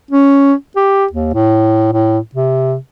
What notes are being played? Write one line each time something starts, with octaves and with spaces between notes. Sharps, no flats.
C#4
G4
D#2
A2
A2
C3